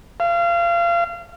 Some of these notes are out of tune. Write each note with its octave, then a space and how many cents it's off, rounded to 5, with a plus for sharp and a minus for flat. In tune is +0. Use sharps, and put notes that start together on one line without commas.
F5 -30